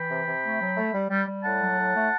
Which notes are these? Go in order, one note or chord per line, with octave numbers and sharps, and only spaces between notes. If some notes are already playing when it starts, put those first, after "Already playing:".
Already playing: E3 G5 B5
C3
C3
A3
F#3
A3
G3
G3
G3
A2 F#5 A5
F#3
A2
A3